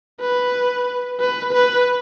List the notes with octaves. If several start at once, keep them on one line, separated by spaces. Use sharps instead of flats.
B4
B4
B4